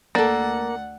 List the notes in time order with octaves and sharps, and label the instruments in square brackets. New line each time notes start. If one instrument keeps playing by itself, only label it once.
[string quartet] D2 F#5 [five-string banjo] A#3 [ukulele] A4 D5